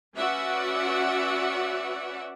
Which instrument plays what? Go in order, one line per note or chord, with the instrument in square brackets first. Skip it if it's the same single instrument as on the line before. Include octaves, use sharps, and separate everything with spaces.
[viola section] C#4 F#4 B4 D5 E5 F#5